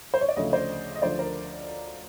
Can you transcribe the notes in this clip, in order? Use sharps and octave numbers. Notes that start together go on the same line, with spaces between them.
C5
C#5
D5
D2 C#3 F3 A3 C#5 D#5
C5 D5
D#5
D2 D3 F3 C5 D5
A#4 C5